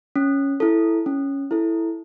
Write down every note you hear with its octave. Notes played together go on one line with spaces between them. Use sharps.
C#4
E4 A4
C#4
E4 A4